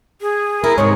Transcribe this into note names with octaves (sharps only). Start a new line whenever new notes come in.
G#4
E4 A#4
G#2 C3 D#3 C#5